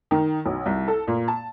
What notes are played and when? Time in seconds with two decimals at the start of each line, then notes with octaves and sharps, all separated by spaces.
0.11 D#3
0.46 B1
0.66 C2
0.88 A4
1.07 A#2
1.28 A5